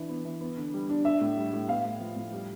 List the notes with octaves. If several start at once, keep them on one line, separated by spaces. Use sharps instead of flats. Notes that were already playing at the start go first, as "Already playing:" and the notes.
Already playing: E3 D4
B3
E3
B3
D3
G3
D4
D4 E5
A2
G3
A2
B3 F5
A2
F3
A2
G3